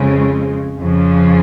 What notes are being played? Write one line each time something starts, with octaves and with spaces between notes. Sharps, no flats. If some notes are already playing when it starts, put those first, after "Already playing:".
Already playing: F2 C#3 G#3 C4
F2 C#3 F3